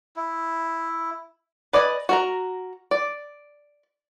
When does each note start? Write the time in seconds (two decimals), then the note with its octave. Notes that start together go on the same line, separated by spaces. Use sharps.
0.16 E4
1.73 B4 D5 D#5 G#5
2.09 F#4 A#4 A#5
2.91 D5